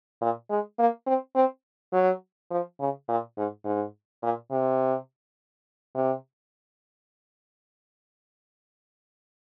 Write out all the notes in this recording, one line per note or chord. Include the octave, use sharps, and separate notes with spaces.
A#2
G#3
A#3
C4
C4
F#3
F3
C#3
A#2
G#2
G#2
A#2
C3
C3